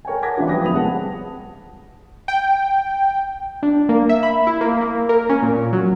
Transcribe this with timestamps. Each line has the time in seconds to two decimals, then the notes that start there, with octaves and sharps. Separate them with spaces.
0.05 A#4 C#5 G5 G#5
0.22 F#5 A5 D6 G#6 A#6 B6
0.37 E3 G3 C#4 D4 F4 A#4
0.49 F3 B4 G5 D#6 A#6
0.62 D1 B3 B5 D#6 F7
0.74 C2 G#3 F#5 A5
2.28 G5
3.63 D4
3.89 A#3
4.09 E5
4.23 B5
4.47 E4
4.61 A#3
4.81 A#3
5.09 A#4
5.29 C#4
5.43 A#2
5.73 F#3